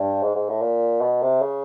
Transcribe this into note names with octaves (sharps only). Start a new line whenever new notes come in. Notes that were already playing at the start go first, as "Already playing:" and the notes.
Already playing: G2
G#2
G#2
A2
A#2
B2
C3
C#3